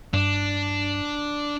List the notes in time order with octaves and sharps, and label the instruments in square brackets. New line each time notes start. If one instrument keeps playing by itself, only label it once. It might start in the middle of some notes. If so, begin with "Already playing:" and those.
[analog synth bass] G2 [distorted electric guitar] D4